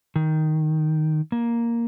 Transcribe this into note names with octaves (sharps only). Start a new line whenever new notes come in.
D#3
A#3